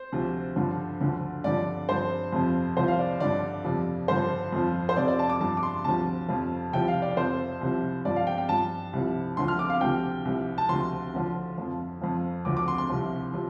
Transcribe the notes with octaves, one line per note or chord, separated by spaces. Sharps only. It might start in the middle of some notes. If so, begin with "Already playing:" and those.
Already playing: C5
D2 C3 F3
G2 D3 F3
D2 D3 F3
G2 D3 F3 D5
G2 F3 C5
F2 C3 F3
C2 C3 F3 C5
F5
D5
G2 D3 F3 D5
F2 C3 F3
G2 D3 F3 C5
F2 F3
C5
F2 C3 F3 D5
D5
A5
D6
G2 F3 A5
D6
C6
D2 C3 F3 A5
F2 C3 F3
C2 C3 F3 G5
F5
D5
F2 C3 F3 C5
C2 C3 F3
G2 F3 D5
F5
G5
G5
G2 F3 A5
C2 C3 F3
D2 D3 F3 C6
F6
D6
F5
D2 C3 F3 G5
C2 C3 F3
A5
D2 C3 F3 C6
D2 D3 F3
F2 F3
F2 F3
D2 D3 F3 D6
D6
C6
C6
C2 C3 F3
C3 F3